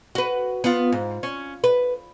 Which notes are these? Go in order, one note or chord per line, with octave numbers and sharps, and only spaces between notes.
F#4 B4
B3 F4
G#2
C#4
B4